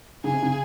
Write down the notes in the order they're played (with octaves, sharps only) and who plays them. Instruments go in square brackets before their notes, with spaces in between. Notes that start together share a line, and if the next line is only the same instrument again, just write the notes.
[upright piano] C#3 [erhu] G#4
[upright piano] C3
C#3